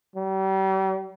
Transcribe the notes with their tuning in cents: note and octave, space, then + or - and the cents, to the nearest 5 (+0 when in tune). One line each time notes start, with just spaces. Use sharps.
G3 -40